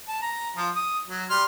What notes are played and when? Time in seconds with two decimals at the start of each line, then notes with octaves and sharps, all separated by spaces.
0.08 A5
0.22 A#5
0.56 F3 F4
0.76 D#6
1.08 F#3
1.30 G3 C6 F6